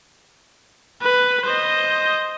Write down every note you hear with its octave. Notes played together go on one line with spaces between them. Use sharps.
B4
C5 D#5